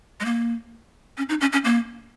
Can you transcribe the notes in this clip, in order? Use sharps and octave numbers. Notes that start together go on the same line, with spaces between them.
G#3
A#3
C#4
D#4
C#4
C#4
A#3